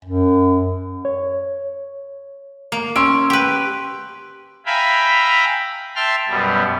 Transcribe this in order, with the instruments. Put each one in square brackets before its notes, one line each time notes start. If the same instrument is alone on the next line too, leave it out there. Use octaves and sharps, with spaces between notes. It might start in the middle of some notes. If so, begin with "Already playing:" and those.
[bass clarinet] F#2
[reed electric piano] C#5
[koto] A#3
[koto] C#4 [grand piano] C6 E6 D7
[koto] G4 B4
[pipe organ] E5 F5 G5 G#5 A#5 B5
E5 G5 A5 C6 F6
F#2 B2 G3